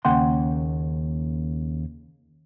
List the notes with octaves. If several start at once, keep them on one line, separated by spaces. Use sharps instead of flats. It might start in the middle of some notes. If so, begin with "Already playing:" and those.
D#2 C#3 A#3 F#5 G5 C6